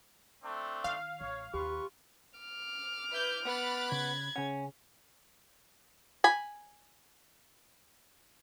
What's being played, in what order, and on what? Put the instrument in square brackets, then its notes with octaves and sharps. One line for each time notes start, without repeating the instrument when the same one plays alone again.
[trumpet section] A3 C4 D4
[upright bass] D#3 [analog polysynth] F5
[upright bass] A1 [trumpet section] C#5
[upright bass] D#2 [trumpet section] F4 B4 C#6 [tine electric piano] G4
[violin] D6 F6
[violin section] E4 B4 G6
[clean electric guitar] B3 [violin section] B5 F#6 A6
[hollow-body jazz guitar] C#3 [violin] G#6
[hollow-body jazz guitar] C#3 F#5 [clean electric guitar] C#4
[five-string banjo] G#5 B5